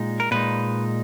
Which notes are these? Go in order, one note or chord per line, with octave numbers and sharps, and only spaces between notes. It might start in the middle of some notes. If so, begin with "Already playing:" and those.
Already playing: A#2 G#3 D#4
A#4
A#2 G#3 D#4 B4